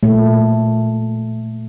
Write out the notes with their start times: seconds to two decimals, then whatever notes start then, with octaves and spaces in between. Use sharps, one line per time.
0.03 A#2 A3